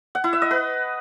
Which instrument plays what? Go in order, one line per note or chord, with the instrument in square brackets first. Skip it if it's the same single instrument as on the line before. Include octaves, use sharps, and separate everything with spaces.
[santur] F#5
E4
E5
D#5
B4